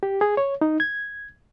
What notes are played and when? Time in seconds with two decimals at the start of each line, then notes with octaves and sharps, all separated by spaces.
0.03 G4
0.21 G#4
0.37 C#5
0.61 D#4
0.80 G#6